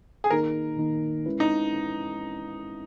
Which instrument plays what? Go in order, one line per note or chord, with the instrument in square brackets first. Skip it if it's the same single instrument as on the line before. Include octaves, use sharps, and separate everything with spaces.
[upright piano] G#4
[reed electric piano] D#3 A#3 D#4 [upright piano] A#4
[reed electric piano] D#3 A#3 D#4
G#3 C#4 E4 B4
[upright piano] D#4